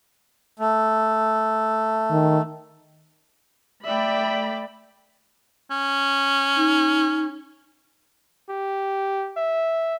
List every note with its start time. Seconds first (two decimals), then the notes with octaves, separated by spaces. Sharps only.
0.59 A3
2.11 D#3
3.84 A3 D5 E5 G5 B5
5.71 C#4
6.57 D#4
8.49 G4
9.37 E5